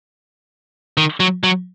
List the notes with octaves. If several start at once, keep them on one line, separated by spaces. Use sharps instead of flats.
D#3
F#3
F#3